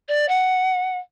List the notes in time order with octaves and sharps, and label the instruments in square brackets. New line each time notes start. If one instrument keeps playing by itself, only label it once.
[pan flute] D5
F#5